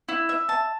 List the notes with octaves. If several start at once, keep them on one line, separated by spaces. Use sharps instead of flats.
E4
E5
A5